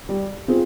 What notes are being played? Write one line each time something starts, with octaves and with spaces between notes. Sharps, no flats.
G3
C4 F4 G#4